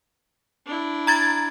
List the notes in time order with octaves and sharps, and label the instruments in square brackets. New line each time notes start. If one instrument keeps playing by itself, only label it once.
[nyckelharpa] D4 E4
[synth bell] A#5 G#6 A6